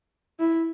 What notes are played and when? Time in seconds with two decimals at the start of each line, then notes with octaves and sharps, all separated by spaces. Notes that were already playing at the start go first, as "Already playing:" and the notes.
0.40 E4